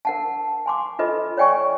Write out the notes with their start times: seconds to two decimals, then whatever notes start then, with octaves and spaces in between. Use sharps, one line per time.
0.05 A#4 F#5 A5
0.66 G#5 C6 D6
0.99 F4 A4 B4 D#5 B5
1.37 C#5 D5 G5 G#5 C#6